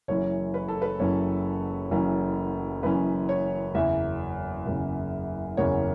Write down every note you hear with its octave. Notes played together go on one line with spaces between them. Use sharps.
F#1 F#2 E3 C#4 C#5
B4
A4
B4
F#1 F#2 E3 C#4 C#5
F#1 F#2 E3 C#4
F#1 F#2 E3 C#4 B4
C#5
F#1 E2 C#3 E5
F#1 E2 C#3
F#1 E2 C#3 C#5